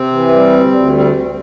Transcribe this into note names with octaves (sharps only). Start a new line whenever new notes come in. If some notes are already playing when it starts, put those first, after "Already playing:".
Already playing: C3 C4
E3
G3
D2
D2
G3 C4